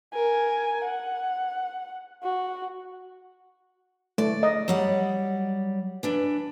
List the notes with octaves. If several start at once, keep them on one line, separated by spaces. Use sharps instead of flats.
A#4 G#5
F#5
F#4
A3 D5
D#5
F#3 G3 F#5
E3 D4 B4